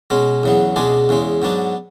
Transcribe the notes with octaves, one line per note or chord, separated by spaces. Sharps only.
B2 G#3 C#4
E2 C#3 F#3 B3
C#2 B2 G#3 D4 G#4
E2 C#3 G#3
G#2 F#3 B3 D4